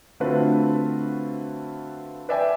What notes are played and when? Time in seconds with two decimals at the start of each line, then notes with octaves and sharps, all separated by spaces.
0.20 D3 A3 C4 F4 F#4 B4
2.29 B4 D5 E5 G5 G#5